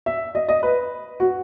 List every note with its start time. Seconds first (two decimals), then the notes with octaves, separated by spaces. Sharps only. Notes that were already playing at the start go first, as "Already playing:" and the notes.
0.06 E5
0.35 D#5
0.48 D#5
0.63 B4
1.20 F#4